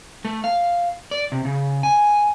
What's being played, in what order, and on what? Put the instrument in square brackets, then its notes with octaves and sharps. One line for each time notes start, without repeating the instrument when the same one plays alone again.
[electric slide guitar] A3
F5
D5
C3
C#3
G#5